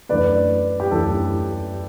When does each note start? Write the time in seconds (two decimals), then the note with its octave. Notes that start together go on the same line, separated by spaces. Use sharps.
0.09 F#2 E3 A3 D4 B4 D5
0.80 G4
0.91 F#2 E3 A3 D4 A4